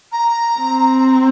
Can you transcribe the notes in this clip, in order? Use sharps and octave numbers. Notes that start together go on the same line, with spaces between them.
A#5
C4